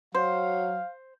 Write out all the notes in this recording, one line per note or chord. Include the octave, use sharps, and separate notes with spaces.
F#3 C5 F5